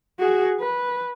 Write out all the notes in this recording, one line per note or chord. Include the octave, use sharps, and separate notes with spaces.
F#4 G#4
B4